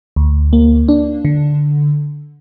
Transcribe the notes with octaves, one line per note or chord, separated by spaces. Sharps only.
D2
A#3
D4
D3